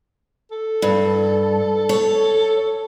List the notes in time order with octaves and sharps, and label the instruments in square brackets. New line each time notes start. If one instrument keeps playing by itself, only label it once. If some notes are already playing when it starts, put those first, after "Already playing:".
[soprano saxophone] A4
[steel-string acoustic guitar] G2
C#5